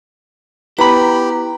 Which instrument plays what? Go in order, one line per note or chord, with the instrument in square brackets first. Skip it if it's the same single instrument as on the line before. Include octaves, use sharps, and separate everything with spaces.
[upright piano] B3 [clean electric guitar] E4 B5 [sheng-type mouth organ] G4 [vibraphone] A#5